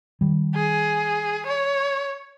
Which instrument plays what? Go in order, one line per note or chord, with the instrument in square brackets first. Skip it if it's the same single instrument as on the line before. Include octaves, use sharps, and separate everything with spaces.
[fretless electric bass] D#3 G3
[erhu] G#4
C#5